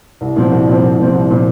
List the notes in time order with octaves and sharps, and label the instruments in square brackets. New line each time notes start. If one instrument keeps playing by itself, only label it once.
[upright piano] C2
A#2 F3 C4
C2
A#2 F3 C4
C2
A#2 F3 C4
C2
A#2 F3 C4